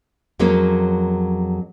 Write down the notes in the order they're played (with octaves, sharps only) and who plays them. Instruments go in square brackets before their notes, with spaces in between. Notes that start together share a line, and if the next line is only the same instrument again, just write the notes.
[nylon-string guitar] F2 F#3 G#3 A#3 C#4